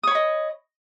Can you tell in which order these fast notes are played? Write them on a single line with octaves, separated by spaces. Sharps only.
D#6 C#5 B5 D#5